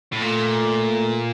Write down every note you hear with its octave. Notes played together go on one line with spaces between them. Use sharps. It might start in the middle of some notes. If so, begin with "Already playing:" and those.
A2
A#2 A3